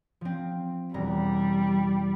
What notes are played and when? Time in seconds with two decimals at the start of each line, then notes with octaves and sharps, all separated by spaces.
0.21 F3 C4
0.94 E1 G3 A#5